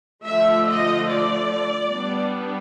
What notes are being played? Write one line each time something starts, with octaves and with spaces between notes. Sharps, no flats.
D3 F3 A3 E5
D#5
D5
G3 B3 D4